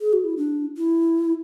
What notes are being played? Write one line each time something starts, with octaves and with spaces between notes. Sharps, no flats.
G#4
F#4
E4
D4
E4